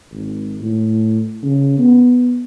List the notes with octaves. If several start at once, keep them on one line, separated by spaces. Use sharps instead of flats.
G#1
A2
C#3
B3